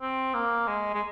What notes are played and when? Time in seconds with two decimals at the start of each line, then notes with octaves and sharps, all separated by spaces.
0.02 C4
0.34 A#3
0.67 G#3
0.94 G#3